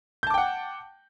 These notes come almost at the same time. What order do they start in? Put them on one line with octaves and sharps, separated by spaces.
G6 A5 D6 G5 F#5